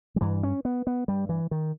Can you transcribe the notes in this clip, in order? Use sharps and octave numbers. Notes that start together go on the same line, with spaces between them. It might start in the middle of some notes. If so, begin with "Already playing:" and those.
G3
G2 E3
C#4
B3
B3
G2 G3
E3
D#3